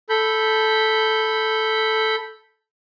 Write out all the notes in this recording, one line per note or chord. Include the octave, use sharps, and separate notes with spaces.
A4 B5 G6